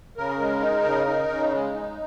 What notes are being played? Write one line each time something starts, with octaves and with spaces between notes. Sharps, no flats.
C#3 A#4
G#3
D#4
C#3
D#4
C#3
G#3
D#4